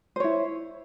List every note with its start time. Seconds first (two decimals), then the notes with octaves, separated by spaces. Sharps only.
0.16 C5
0.20 C#5
0.24 E4